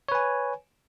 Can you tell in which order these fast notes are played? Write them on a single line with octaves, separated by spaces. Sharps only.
C#5 B4 G#5